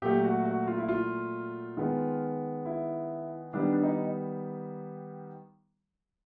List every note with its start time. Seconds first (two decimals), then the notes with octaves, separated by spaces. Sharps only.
0.02 A#2 F#3 A3 G4
0.24 F#4
0.45 F#4
0.67 F4
0.78 E4
0.88 F4
1.77 D#3 G#3 B3
2.65 E4
3.53 D#3 G3 B3 D4
3.73 D4
3.83 D#4